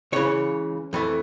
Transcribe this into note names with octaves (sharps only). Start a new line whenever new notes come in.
C#2 C#3 E3 C#5
F2 E3 A3